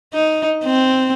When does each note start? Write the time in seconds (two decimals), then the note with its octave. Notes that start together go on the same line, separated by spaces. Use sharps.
0.14 D#4
0.65 C4